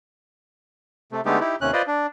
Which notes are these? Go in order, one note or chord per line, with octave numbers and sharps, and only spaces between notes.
C3 A3
D3 G#3 A3 B3 D#4 G4
D#4 E4 G4
D#2 C3 C#4 F#6
F4 B4 C5 D5 D#5
D4